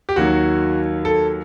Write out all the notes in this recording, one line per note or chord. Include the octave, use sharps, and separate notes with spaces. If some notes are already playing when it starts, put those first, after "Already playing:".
G4
D#2 D#3 F#3 F#4
A4